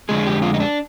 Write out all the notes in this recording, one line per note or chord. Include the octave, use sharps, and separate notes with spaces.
F2 D3 G#3 G#4
G4
F4
D#4
D4